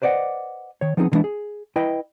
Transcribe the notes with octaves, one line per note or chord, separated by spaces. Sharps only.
B4 C5 D5 D#5 F#5
D#3 C#5
F3 B3 C4 D#4 F#4 G#4
D3 E3 G#3 B3 D4 E4
G#4
E4 B4 D#5 G5